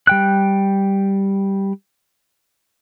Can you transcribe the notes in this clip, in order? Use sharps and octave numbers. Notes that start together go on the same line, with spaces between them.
G3 G5 F#6